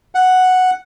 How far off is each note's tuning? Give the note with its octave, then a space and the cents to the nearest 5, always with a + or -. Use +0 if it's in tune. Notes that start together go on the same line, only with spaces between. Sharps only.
F#5 +0